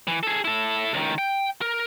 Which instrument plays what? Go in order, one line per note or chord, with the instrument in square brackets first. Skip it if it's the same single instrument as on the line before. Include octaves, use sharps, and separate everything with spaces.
[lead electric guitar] E3
G#4 A4
E4 A4
C#2 D#3
G5
A#4